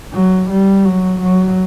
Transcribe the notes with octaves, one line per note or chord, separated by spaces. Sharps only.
F#3
G3
F#3
F#3